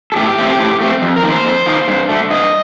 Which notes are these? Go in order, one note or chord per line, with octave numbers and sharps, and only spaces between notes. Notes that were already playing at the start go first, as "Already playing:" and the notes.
A4
A2 G4
A3 C4
A2
A3 C4
F2
A#4
D#3 A#3
C5
F2
D#3 A#3
G2
D3 A3
G2 D#5